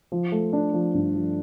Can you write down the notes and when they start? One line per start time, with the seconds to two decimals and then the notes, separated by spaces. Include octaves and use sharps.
0.12 F3
0.32 A3
0.53 D4
0.74 F3
0.94 G2
1.15 F3